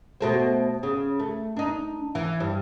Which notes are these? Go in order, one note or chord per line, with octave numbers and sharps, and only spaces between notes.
B2 A3 C4
C#3
A3
D4 D#4
E3
G2